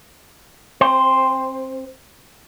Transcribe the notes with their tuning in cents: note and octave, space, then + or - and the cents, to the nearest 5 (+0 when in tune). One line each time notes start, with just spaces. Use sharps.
C4 +25 C5 +0